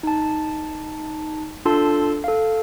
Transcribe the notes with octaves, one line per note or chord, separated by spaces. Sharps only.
D#4 A5
D4 F4 A4 A5 C6 E6
A4 F5